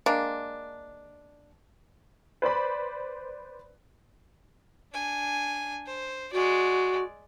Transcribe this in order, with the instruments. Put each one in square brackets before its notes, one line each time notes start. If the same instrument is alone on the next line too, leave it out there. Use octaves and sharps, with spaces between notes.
[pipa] G#3 A#3 D4
[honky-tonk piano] B4 C5 D5 B5
[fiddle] D4 G#5
C5
[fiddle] G#3 D5 [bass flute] F#4